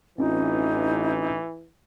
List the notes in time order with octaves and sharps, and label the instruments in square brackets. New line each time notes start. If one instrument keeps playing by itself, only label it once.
[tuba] A1 [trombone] E3 [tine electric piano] C4 C#4 F4 [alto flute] D#4